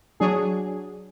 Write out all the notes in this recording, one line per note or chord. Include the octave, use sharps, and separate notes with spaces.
F#3 D4 G#4